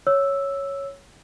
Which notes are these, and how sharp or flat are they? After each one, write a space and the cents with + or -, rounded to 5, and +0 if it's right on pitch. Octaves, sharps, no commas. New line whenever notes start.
C#5 +0 E6 +0